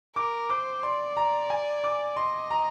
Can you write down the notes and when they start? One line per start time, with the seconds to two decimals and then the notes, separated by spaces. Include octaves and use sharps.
0.16 A#4 D6
0.50 C5 D6
0.83 D5 C6
1.17 A#5
1.50 G#5
1.84 D6
2.16 D#5 C6
2.51 A#5